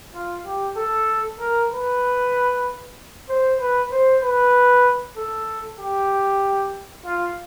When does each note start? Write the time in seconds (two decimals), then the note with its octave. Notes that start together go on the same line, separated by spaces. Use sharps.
0.15 F4
0.46 G4
0.77 A4
1.40 A#4
1.71 B4
3.29 C5
3.60 B4
3.92 C5
4.23 B4
5.17 A4
5.80 G4
7.06 F4